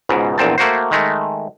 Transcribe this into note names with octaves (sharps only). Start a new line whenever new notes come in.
C#2 G#2 B2
A#1 E2 A#2 C4 A5
A3 A#3 F#4 C5
D#3 G#3 A3